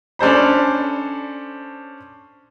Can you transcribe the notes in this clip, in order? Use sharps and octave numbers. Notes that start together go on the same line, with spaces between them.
C#4 D4 A4 C5 B5